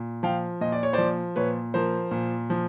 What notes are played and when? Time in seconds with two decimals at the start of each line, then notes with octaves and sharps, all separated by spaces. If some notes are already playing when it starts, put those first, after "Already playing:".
Already playing: A#2
0.23 F3 F5 G5
0.61 A#2 D#5
0.72 D5
0.83 C#5
0.93 F3 C5 D5
1.36 A#2 B4 C#5
1.74 F3 A#4 C5
2.11 A#2
2.50 F3